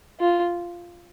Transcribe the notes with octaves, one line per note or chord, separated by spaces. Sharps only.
F4